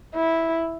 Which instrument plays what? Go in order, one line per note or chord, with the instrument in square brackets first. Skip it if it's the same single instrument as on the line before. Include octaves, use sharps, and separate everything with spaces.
[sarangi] E4